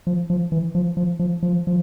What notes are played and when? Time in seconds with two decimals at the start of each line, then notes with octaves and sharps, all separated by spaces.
0.07 F3
0.30 F3
0.52 E3
0.75 F3
0.97 F3
1.19 F3
1.43 F3
1.67 F3